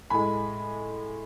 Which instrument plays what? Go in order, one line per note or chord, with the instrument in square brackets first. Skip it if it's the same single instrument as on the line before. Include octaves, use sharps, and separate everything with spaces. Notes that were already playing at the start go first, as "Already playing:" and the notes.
[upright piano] A2 G#3 G#5 B5